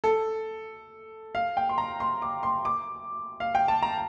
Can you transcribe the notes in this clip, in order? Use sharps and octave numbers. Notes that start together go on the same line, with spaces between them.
A4
F5
G5
C6
A#5
C6
D6
C6
D6
F5
G5
A5
A#5